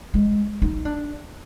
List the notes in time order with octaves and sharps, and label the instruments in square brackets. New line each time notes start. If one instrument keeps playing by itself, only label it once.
[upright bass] G#3
D#4
D4